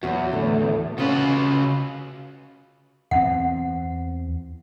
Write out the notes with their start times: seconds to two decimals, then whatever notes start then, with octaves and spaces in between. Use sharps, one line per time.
0.03 E2 F#3 F#4
0.32 A2 D3
0.98 C#3 C#4 F4 F#4 B4
3.11 E2 C4 F#5